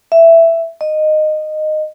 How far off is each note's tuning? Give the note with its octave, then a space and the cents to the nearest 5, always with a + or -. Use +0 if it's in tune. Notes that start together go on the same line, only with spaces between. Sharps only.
E5 +10
D#5 -15